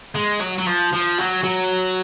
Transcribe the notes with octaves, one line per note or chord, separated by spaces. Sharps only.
G#3
F#3
F#3
F3
F3
F#3
F#3